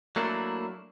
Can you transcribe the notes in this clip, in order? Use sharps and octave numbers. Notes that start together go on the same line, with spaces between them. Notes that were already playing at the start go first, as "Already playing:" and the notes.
F#3 A3 A#3 D4 E4